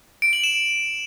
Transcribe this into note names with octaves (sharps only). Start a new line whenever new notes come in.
D7
F#7
E7